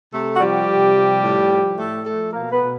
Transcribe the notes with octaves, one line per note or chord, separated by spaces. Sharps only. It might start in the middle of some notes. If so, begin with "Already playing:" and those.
C3 A3 A4
F#4
F3 G3 G4
C3
F3
A2
F3
A2 A3 A4
F3 A3 A4
B2 A#3 A#4
B3 B4
B2